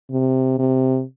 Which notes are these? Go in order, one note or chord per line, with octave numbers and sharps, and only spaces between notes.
C3
C3